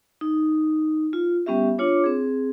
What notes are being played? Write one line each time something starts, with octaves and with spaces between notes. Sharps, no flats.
D#4
F4
G3 B3 C#4 G4 E5
D4 F4 C#5 D6
C4 G#4